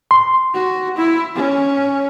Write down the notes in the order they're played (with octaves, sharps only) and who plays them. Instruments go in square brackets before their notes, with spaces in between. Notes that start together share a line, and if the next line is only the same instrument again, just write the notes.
[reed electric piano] C6
[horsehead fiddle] F#4
E4
C#4